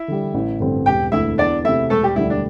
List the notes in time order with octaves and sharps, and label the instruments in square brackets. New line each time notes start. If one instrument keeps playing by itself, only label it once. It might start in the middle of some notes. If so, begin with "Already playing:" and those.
Already playing: [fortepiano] E4 E5
[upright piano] D3 G3
A1
G2 D3 C4
[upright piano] E1 [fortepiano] G4 G5
[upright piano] D2 D3 A3 [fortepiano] E4 E5
[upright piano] E2 [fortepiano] D4 D5
[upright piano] C3 A3 [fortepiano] E4 E5
[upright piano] E1 [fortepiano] A3 A4
[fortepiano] G3 G4
[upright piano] D2 D3 G3 D4 [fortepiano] E4
[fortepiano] D4